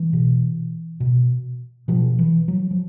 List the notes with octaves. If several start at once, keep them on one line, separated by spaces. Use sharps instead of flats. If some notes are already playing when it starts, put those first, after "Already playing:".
Already playing: E3
B2
B2
B2 F3
E3
F#3
F3